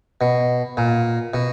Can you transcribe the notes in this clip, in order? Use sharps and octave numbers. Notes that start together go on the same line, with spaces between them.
B2
A#2
B2